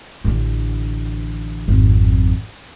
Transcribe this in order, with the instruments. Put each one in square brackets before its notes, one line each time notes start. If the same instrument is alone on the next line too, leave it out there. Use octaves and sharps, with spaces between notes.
[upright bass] A1 D3
G#1 F2